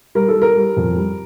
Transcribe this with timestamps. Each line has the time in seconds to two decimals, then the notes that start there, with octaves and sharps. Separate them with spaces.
0.15 G3 A#4
0.28 A4
0.35 G3
0.42 A#4
0.56 G3
0.77 F2
0.96 G3